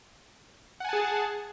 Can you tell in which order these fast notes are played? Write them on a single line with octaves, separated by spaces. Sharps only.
F#5 G#5 A5 G#4